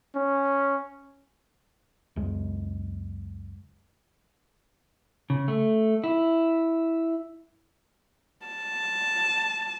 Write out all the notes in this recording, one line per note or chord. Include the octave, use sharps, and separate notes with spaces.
C#4
C#2 F#2 G#3
C#3
A3
E4
A5